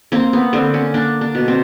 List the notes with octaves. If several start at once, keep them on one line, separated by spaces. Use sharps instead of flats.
A#3 C4
B3
D3 C4
C#4
A#3 D4
D4
B2
C4